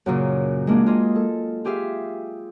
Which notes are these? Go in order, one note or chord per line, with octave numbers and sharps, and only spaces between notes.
F#2 A#2 C#3
G#3 A#3 D4 G#4
F4 G#4 D#5
A4
F4 G4 G#4 E5 F5